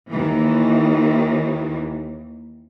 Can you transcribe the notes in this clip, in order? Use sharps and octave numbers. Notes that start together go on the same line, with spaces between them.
D#2 D#3 E3